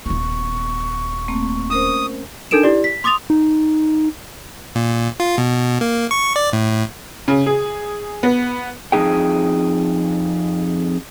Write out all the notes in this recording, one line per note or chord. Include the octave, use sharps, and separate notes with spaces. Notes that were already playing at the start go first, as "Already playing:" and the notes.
D#1 B3 C#6
A3 A#3 C4
C#4 A#4 C5 D#6
D4 D#4 A4 A#4 D7 E7
E4 G4 D5
B6
C6 D6 D#6 A6 F7
D#4
A#2
F4
B2
A#3
C#6
D5
A2
C#3
G#4
B3
F2 G3 D#4 G#4 G5